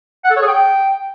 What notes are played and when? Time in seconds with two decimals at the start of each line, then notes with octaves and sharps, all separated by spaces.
0.24 F#5
0.30 A4
0.36 C#5
0.42 G#4
0.48 G5